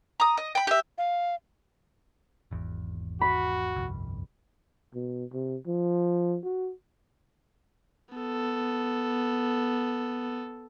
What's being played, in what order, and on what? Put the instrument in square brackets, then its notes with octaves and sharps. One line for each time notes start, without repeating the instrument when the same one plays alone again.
[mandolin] A#5 D#6
D#5
G5 B5
G4 E5
[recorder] F5
[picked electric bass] G#1 E2
[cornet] F#4 [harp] B5
[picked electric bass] G1 C2 F2
[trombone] B2
C3
F3
F#4
[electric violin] B3 A4